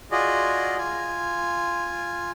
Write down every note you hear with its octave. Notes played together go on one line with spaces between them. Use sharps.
F4 F#4 G#4 D5 D#5
F4 G#5